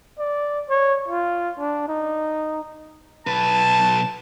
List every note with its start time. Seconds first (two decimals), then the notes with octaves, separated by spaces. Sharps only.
0.18 D5
0.69 C#5
1.08 F4
1.58 D4
1.88 D#4
3.27 B1 B4 A5